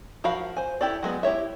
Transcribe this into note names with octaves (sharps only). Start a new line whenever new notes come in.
F3 F#4 A#4 F5 B5
C5 G#5
E4 G4 A4 D5
F#3 G#3 B3
E4 G4 C#5 E5